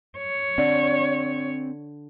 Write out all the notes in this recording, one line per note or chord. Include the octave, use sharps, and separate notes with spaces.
C#5
D3 C4